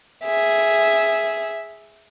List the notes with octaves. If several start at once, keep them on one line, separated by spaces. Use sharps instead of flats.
G#4 E5